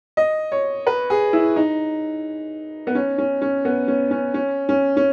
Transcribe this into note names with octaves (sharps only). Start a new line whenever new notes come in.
D#5
C#5
B4
G#4
E4
D#4
B3
C#4
C#4
C#4
B3
C#4
C#4
C#4
C#4
C#4